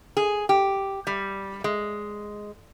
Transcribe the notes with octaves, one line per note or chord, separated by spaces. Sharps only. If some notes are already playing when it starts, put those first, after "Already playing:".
G#4
G4
G3
G#3